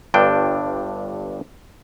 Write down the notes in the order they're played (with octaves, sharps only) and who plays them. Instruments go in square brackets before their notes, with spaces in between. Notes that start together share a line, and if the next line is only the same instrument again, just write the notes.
[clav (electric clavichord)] G1 G2 D4 G5